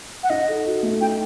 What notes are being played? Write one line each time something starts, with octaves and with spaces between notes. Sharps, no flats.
F#5
D#4 D#5
A4
F#4
A3
D#4 G5